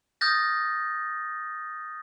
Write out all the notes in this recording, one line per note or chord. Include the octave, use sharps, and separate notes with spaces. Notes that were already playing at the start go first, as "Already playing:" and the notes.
D#6 F6 G6 A6 A#6